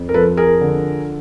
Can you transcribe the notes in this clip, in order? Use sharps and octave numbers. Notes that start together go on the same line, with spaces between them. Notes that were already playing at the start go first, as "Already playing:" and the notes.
Already playing: F2
A#4
F3 A4 B4
G#4 A#4
D3